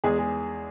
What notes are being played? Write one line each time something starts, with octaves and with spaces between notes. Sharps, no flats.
E2 G#3 G#4
G#3